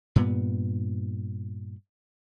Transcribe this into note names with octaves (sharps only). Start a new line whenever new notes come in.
G2 A#2 B3